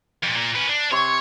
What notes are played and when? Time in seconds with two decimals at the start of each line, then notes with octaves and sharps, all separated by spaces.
0.23 F2 A#2
0.36 A#2
0.55 C#4 B4
0.68 D4
0.91 C3 C#5 C6 C#6